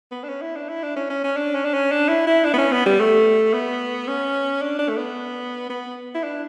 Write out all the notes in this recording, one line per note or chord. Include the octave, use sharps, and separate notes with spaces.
B3
D4
C#4
E4
D4
E4
D4
C#4
C#4
C#4
D4
C#4
D4
C#4
D4
E4
E4
D4
B3
C#4
B3
G3
A3
B3
C#4
D4
D4
A3
B3
B3
E4
D4